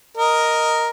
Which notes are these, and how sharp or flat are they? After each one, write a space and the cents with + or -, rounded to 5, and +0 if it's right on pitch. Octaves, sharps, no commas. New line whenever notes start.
A#4 +0 D#5 +0